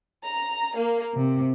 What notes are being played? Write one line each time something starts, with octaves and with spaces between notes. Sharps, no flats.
A#5
A#3
C3